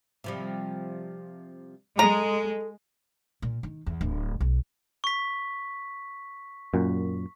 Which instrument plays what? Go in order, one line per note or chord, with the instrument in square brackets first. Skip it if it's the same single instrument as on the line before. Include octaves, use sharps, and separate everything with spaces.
[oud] C3 F3 G3
[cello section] G#3 [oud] A4 C#5 [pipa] A#5
[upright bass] A#2
D#3
E2
D1
B1
[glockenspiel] C#6 B6
[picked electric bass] F#2 A#2